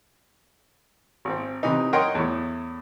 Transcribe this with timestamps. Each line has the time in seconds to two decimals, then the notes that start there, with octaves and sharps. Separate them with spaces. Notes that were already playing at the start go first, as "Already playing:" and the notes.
1.25 G#1 C4
1.63 C3 E3 D#4
1.93 A#4 C#5 D#5 F#5 G5 C6
2.15 E2 A2